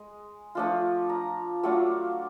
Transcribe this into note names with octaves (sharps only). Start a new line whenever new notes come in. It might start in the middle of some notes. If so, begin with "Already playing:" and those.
Already playing: G#3
F3 A3 D4 F4
A#5
F#3 A3 D4 F4